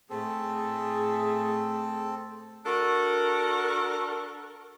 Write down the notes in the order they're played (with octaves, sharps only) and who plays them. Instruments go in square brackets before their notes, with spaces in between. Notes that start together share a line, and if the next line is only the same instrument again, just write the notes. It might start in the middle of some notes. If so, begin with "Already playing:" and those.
[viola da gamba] A2 A3 [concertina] C4 A4 [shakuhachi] G#4
[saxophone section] D4 F#4 A4 A#4